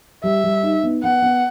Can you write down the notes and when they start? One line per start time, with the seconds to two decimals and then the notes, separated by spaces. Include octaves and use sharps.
0.24 G3 E5
0.44 G3
0.63 D#4
0.83 B3
1.03 B3 F#5
1.22 B3